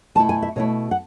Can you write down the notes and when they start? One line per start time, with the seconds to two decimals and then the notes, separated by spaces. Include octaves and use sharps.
0.15 B2 A3 E4 A5
0.29 G#5
0.42 E5
0.56 B2 A3 E4 C#5
0.91 F#5